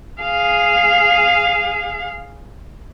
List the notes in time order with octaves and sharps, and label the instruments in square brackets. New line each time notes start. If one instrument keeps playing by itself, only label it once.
[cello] G#4 F5